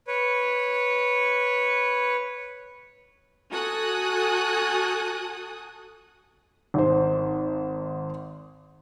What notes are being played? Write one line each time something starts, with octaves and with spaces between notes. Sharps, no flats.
B4 C#5
F#4 A4 G#5 D#6 F#6
G#1 C5